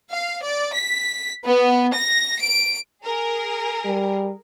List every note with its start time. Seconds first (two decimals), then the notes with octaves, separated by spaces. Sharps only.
0.11 F5
0.43 D5
0.73 B6
1.45 B3
1.94 A#6
2.39 D7
3.03 G#4 A#4
3.85 G3